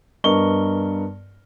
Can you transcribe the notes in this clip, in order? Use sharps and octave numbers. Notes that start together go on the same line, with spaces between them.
G2 B3 A#4 D#5 C#6 G7